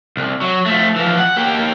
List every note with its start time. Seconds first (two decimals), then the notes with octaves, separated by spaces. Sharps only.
0.17 C2
0.41 F#3
0.66 F3 A3
0.96 E3 F3
1.18 F#5
1.37 A#3 G4